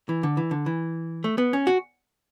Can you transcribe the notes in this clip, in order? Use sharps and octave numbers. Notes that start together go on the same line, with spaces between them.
E3
D3
E3
D3
E3
A3
B3
C#4
F#4